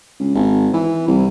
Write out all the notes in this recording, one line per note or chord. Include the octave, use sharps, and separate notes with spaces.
C#2
G#1
E3
C2